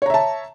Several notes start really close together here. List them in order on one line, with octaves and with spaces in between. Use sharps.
C#5 A#5 E5 A5